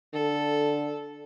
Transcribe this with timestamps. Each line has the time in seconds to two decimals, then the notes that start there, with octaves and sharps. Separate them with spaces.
0.14 D3 A4